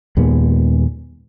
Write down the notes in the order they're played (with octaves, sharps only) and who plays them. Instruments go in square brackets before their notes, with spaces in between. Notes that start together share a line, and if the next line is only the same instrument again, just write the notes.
[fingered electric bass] D#2 A#2 G#3 B3